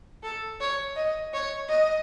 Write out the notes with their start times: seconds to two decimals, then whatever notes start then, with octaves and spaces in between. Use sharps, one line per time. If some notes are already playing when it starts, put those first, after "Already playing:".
0.23 A4
0.60 C#5
0.96 D#5
1.34 C#5
1.69 D#5